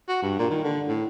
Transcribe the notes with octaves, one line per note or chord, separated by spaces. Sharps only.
F#4
G2
A#2
D#3
D3
A2